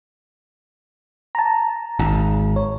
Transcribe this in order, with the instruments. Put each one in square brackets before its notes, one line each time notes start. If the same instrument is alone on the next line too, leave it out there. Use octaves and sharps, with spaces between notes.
[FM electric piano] A5 A#5
[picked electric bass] G#1
[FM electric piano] C#5